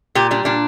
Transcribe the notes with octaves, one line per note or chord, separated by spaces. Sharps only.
A#2 G4
G3 D4
A#2 D4